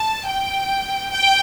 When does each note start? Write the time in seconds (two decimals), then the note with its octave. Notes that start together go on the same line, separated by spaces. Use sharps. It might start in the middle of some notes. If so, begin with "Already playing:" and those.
Already playing: A5
0.27 G5
1.12 G5